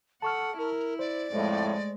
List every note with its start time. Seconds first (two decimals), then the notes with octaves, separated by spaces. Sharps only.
0.22 A4 F#5 A5 C#6 F6
0.58 E4 A#4
0.99 C5 D5
1.33 F2 A2 G#3 A3